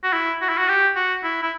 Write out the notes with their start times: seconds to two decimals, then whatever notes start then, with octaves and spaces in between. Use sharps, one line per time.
0.04 F#4
0.13 E4
0.41 F#4
0.49 E4
0.58 F#4
0.68 G4
0.96 F#4
1.24 E4
1.43 E4